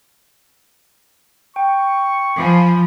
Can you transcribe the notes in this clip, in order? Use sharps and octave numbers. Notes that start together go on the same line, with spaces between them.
G5 C#6
F3 G#5 B5 D6